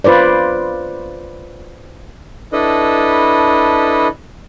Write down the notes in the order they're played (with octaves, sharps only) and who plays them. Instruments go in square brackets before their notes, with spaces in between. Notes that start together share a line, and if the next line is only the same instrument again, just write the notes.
[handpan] F4 B4 C5 D5
[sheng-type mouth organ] D4 E4 A4 B4 D#5